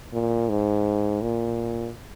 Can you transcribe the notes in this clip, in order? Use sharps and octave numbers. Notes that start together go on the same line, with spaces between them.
A#2
G#2
A#2